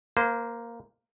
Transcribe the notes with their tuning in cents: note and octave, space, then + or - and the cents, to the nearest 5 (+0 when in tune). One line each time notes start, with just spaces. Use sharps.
A#3 +0 C5 -30